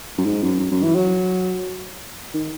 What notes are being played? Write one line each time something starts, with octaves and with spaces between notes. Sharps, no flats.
F#2
G#2
F#2
F#2
F#2
E3
F#3
D#3